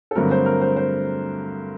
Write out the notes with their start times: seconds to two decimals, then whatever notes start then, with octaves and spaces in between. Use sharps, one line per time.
0.11 A4
0.16 G2 D3 F#3 A3 C4 A#4
0.31 C5
0.46 A#4
0.61 C5
0.76 C5